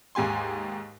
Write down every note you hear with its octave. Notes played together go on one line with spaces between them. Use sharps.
D#2 G#2 G4 G#5 C6